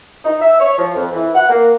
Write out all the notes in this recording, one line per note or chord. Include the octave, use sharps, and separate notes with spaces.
D#4
E5
C#5
F3
F2
E3
F#5
A#3